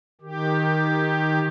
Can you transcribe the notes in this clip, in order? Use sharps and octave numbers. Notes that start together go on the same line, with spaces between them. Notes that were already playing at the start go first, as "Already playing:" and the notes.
D#3 G4